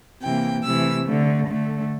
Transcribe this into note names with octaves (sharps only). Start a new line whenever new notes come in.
C3 E3 A#3 G5
C3 E3 A3 E6
D3 A3
D3 A3